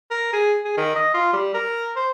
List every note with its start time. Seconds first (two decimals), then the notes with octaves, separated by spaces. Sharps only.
0.11 A#4
0.33 G#4
0.65 G#4
0.77 D#3
0.96 D#5
1.14 F4
1.33 G3
1.54 A#4
1.96 C5